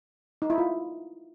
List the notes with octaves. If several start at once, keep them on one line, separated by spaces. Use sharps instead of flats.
D#4
E4
F4